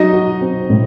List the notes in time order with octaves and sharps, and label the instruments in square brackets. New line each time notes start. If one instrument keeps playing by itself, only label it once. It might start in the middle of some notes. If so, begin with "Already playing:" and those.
Already playing: [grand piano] F#3 [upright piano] D#4 D#5
[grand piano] F#4
C4
A2